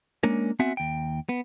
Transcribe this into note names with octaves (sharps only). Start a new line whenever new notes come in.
G#3 A#3 C#4 D4 A#4
B3 C4 F#4 E5 F#5 G#5
D#2 G5
B3